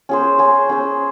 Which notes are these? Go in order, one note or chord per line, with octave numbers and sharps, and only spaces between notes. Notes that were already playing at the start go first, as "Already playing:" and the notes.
C#4 G#4 C5
C#4 G#4 C5
C#4 G#4 C5